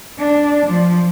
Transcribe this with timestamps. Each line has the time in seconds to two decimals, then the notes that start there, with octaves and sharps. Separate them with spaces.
0.19 D4
0.66 F3